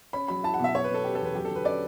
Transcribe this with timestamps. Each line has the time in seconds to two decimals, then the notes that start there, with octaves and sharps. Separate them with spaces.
0.13 C#4 B5
0.28 F#3 B5
0.44 E4 A5
0.54 F#5
0.60 B2 E5
0.74 F#3 C#5
0.84 B2 B4
0.94 A4
1.04 C#4 G4
1.15 A4
1.20 E2 B4
1.35 F#3 G4
1.45 A4
1.50 D3
1.55 B4
1.65 C#4 D5